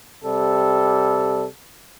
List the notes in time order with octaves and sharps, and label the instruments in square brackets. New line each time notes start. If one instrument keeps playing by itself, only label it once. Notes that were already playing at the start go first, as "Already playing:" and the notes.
[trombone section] C3 G3 A4